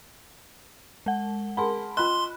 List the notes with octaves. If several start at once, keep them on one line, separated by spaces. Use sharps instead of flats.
G#3 F#5
G#4 A#4 F#5 A5 B5 C6
F4 D#5 B5 C6 F#6